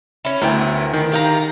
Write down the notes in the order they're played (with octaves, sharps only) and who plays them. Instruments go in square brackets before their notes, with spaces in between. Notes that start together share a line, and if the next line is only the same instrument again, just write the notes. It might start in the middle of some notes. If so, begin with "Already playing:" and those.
[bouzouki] C#4 E4
[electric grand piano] D2 E4 G5 [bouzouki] B3 C4 A#4
[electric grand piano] D#3
[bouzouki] G4 F5 A#5